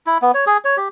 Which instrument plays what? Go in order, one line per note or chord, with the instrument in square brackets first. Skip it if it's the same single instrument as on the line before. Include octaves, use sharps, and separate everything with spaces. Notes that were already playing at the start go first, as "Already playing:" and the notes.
[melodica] E4
B3
C#5
G#4
C#5
G4